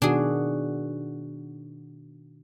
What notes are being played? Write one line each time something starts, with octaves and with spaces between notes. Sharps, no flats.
B2 D#3 D4 F#4 G#4